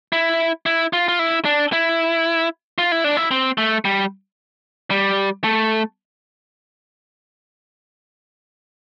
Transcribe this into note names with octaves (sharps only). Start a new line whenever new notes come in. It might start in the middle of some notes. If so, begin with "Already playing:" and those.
E4
E4
F4
F4
E4
D4
E4
F4
E4
D4
E4
C4
A3
G3
G3
A3